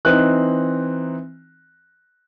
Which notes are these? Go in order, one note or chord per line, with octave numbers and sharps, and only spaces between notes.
E3 C4 D#4 F#6